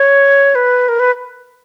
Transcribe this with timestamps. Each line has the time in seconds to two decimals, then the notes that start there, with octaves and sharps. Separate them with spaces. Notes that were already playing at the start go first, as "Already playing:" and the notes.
Already playing: C#5
0.55 B4
0.89 A#4
0.99 B4